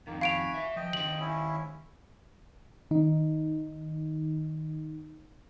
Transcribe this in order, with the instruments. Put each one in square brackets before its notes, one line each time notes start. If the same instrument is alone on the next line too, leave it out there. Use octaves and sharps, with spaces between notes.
[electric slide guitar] F2 D#3 [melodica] A#3
[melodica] F#4 G#5 B5 [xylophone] F5 D7 F7
[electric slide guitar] B4 E5
[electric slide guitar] F3 [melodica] D#5 G5
[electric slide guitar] D#3 G4 C5 [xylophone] F#7
[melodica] C#4 E4
[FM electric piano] D#3 D#4